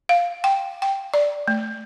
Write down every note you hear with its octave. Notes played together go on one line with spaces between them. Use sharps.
F5
G5
G5
D5
A3